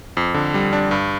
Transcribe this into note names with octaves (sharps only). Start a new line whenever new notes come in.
F2
D3
G3
D4
G2